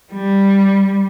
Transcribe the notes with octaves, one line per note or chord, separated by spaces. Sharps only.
G3